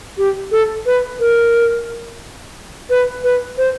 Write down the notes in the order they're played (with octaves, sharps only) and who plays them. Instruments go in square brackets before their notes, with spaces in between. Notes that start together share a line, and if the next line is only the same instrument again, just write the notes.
[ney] G4
A4
B4
A#4
B4
B4
C5